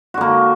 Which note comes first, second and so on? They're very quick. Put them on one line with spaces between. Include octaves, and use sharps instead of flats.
F#4 D3 A#3